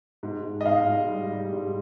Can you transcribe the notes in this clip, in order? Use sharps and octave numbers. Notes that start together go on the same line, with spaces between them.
G#2
G#2
D#5
G#2 F5
G#2
G3
G3
G#2